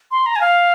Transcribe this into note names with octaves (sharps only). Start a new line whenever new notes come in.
C6
A#5
G#5
F5